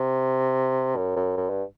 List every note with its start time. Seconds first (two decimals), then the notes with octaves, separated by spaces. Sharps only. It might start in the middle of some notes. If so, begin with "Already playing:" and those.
Already playing: C3
0.97 F#2
1.16 F#2
1.37 F#2
1.50 G2